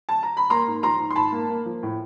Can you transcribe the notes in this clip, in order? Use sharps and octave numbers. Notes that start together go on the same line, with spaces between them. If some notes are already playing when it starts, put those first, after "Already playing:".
A5
A#5
B5
A#3 A#5 C6
G#2
F3 A#5 C6
G#2
C6
G#2 A5 B5
A#3
A#3
F3
A2